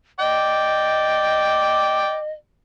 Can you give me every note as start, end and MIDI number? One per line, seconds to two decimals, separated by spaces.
0.19 2.18 74
0.19 2.32 75
0.19 2.18 79